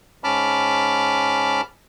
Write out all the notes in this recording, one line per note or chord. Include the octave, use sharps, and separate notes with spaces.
G#2 C#4 A5 B5 D6 F6